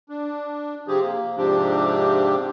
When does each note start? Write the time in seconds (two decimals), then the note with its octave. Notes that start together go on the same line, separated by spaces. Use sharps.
0.09 D4
0.87 C3 F3 C4 G4 G#4
1.02 A#3
1.37 G#2 C3 F3 C4 D4 G4